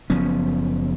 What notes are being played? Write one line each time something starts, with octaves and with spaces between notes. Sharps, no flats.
F#1 F3 B3 C#4